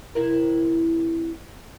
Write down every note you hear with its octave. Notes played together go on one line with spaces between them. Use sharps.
C3 E4 A#4